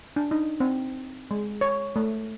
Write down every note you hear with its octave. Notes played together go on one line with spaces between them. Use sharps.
D4
D#4
C4
G#3
C#5
A3